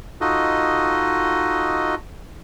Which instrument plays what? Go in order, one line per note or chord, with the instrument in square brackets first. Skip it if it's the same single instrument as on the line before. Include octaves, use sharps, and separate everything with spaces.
[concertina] D#4 F4 F#4 A4 D#5